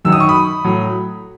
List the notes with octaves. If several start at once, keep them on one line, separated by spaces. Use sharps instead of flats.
F#2 D#3 F#3 E6
D#6
C#6
B5 D#6
A2 F#3